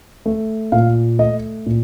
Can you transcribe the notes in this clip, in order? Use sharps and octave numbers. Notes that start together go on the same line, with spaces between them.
A3
A#2 F5
A3 D#5
A#2